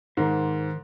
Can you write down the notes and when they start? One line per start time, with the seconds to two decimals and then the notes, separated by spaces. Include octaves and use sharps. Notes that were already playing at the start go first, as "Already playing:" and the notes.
0.17 G#2 D#3 A#4 C5